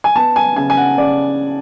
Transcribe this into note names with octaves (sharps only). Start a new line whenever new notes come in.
G#5
B3 A5
G#5
C#3 G#5
G#5
F#5
C#3 D5